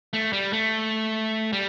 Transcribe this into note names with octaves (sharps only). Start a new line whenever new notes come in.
A3
G3
A3
G3